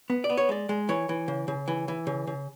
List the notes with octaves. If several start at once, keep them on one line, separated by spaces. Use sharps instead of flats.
B3
D5
B3
C#5
G#3 D5
G#3
E3 C#5
E3
C#3
C#3
E3
E3
C#3
C#3